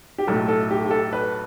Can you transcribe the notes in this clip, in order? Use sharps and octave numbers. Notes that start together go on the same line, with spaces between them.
G4
B1 A2 A3 A4
A4
G4
G4
A4
B4